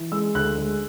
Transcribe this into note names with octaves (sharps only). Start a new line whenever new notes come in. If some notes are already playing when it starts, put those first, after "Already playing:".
Already playing: E3
G#3 E6
D2 F#6
G#3